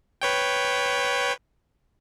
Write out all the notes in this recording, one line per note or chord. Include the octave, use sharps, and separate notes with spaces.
B4 C#5 G5